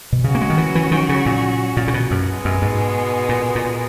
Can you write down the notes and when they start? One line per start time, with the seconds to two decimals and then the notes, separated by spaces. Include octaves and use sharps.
0.12 B2
0.24 C#3 F#3 C#4 F#4
0.35 A#3
0.41 G#3
0.50 D#3
0.58 E3
0.75 E3
0.91 D#3
1.09 C#3
1.26 A#2
1.77 A#2
1.88 C#3
1.94 B2
2.11 F#2
2.27 B2 G#3 B3
2.45 F#2
2.62 G#2
3.29 A#2
3.55 A#2